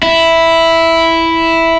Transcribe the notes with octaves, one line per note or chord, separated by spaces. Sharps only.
E4